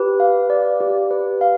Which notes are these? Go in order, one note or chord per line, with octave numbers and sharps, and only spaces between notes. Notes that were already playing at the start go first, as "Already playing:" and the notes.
Already playing: G4 B4
F5
D5
G4
B4
F5